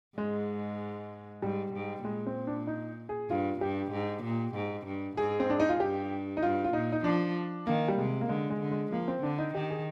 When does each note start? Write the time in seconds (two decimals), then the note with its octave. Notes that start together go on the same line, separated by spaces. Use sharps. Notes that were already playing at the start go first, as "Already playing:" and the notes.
0.18 G#2 G#3
1.42 G#2 G3
1.74 G#2
2.05 A#2 G#3
2.26 C4
2.47 D4
2.67 D#4
3.09 G#4
3.29 G2 F4
3.61 G2 G4
3.92 G#2
4.24 A#2
4.55 G#2
4.86 G2
5.17 G#2 G#4
5.40 C4
5.50 D4
5.60 D#4
5.69 F4
5.80 G2 G4
6.37 D#4
6.42 G2 F4
6.64 F4
6.73 A#2 D#4
6.92 D#4
7.04 F3 D4
7.67 D#3 A#3
7.88 G3
7.98 C3 G#3
8.21 A#3
8.29 D3 G#3
8.50 G#3
8.60 D3
8.71 G#3
8.92 F3 A#3
9.08 C4
9.22 D3 D4
9.38 D#4
9.54 D#3 G4
9.70 G#4